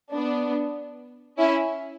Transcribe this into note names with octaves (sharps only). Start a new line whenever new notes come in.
B3 D4
C#4 E4